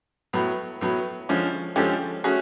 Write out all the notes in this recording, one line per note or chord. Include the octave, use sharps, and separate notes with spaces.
A2 F#3 B3
A2 F#3 B3
D3 F3 G#3 C#4
D3 F3 G#3 C#4 G4 A4
A3 C#4 F#4 G#4